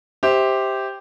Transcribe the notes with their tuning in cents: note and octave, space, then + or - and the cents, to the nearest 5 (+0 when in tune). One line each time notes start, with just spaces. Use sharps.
G4 +0 C5 +0 E5 -25